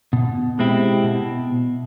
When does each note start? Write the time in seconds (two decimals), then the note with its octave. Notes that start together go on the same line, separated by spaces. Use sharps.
0.13 B2
0.59 G#3 C4 E4 G4
1.04 B2